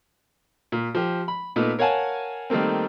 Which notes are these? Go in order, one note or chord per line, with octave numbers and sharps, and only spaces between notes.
A#2
F3 G4
B5
A#2 A3 B3 D#4
A#4 C#5 F5 F#5 G#5 A5
D#3 G3 A3 A#3 C4